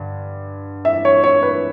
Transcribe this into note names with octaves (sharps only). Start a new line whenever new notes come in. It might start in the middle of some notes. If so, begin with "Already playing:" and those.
Already playing: G2 D3
E5
C#5
C#5
B4